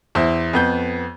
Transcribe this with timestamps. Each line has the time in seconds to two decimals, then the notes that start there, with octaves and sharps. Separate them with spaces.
0.15 E2 E4 C5
0.53 F2 B3 G6